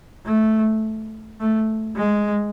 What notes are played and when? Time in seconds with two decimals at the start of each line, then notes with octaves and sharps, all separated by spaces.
0.26 A3
1.40 A3
1.96 G#3